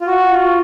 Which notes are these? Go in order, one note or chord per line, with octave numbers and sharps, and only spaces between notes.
F4
F#4
F4